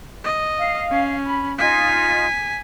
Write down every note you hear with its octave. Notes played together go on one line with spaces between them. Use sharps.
D#5
F5
C#4
B5
D#4 F4 G#5 B6